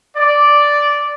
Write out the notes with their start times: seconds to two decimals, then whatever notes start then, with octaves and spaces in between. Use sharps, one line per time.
0.17 D5